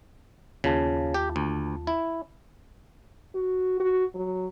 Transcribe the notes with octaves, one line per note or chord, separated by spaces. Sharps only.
D#2 C#3 F4 A5
G4
D2
E4
F#4
F#4
F#3